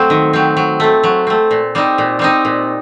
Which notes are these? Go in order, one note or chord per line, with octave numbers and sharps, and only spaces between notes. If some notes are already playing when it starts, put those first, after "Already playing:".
Already playing: F#3 A3 C4
D#3
F#3 C4
F#3
A3 C4
F#3
A3 C4
A#2
G3 C4 D#4
A#2
G3 C4 D#4
A#2